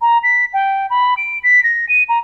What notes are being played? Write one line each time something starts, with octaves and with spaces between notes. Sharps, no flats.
A#5
B6
G5
B5
D7
B6
A#6
D#7
A#5